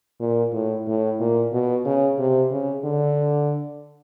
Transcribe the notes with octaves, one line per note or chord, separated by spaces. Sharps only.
A#2
A2
A2
A#2
B2
C#3
C3
C#3
D3